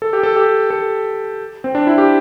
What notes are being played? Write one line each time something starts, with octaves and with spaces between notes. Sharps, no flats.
A4
G4
A4
G4
A4
C4
D4
E4
G4